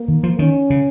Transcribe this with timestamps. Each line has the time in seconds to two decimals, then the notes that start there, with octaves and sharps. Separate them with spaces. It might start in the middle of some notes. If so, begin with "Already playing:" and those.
Already playing: A#3
0.08 D#3
0.23 F3
0.39 D#3 C#4
0.70 C#3